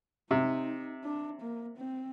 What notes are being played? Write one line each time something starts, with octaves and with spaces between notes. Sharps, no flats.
C3 D#4
D4
A#3
C4